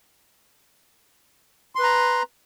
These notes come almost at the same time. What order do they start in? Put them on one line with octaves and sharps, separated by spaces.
C6 B4 A#5